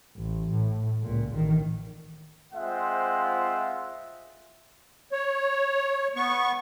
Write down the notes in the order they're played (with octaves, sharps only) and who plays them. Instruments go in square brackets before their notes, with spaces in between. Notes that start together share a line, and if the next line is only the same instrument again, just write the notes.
[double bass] A1
A2
C#2 A#2
A1 D#3
[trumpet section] G#3 C4 F4 C5 E5 F#5
[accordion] C#5
B3 C#6